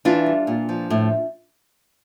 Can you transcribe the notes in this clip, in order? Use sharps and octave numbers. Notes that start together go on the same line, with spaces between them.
E3 D4 F4
G3
A#2
F3
A2